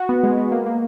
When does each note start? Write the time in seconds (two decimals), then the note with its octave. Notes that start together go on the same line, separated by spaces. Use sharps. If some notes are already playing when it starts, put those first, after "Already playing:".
Already playing: F#4
0.09 B3
0.23 G#3
0.38 B3
0.52 A#3
0.66 A#3